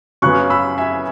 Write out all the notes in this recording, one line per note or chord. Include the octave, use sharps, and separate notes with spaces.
F#2 C#3 F#3 B3 C#6 F#6
B5 E6
E5 G#5